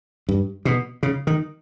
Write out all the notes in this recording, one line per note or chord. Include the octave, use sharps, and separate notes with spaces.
G2
B2
C#3
D#3